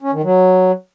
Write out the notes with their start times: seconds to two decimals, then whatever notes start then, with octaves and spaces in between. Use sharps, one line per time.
0.02 C#4
0.13 D#3
0.24 F#3